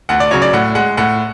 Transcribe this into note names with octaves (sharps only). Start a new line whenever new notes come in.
D2 F#5
D5
C#3 F#3 C#5
D5
A2 F#5
G#3 F#5
A2 F#5